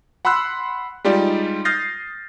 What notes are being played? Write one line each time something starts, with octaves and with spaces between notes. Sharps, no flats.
F#5 B5 C6 E6 F#6
G3 G#3 D#4 F4 G4 D5
D#6 F6 G6 A6 A#6 C7